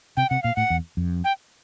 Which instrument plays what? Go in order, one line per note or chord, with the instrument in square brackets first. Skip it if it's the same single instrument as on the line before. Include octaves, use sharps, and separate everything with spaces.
[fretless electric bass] C3 [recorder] G5
[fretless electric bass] C3 [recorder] F#5
[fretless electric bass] A#2 [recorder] F5
[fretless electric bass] A2 [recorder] F#5
[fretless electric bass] E2
F2
[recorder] G5